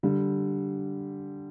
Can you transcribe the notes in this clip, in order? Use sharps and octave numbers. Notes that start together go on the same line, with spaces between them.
D3 G3